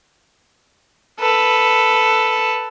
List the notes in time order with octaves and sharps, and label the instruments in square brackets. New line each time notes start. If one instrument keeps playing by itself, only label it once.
[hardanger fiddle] A4 B4